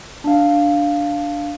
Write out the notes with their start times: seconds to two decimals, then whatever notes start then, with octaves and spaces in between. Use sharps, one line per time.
0.24 D4 F5